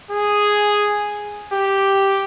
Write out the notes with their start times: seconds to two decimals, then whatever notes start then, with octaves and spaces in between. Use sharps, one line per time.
0.11 G#4
1.53 G4